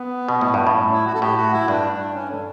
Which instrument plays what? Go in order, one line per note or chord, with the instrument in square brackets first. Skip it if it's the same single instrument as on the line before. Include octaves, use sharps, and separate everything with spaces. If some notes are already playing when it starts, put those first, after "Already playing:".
Already playing: [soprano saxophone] B3
[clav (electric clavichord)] B2
A2
G2
A2
[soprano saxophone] C#4
E4
F#4
A4
[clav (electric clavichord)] A2 [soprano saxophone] G4
[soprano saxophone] F#4
E4
[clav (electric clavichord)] G2 [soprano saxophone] D4
[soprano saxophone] D4
C#4
A4